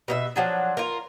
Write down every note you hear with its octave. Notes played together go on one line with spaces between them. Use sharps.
B2 A#4 E5
F3 F#3 D4
F4 A#4